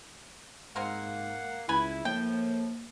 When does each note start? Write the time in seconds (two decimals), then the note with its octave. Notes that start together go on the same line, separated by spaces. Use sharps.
0.76 G#2 G#3 A#3 C4 A#4 F5 F#5
1.69 C#2 B3 E4 G#5 B5
2.05 A2 F3 A#3 G5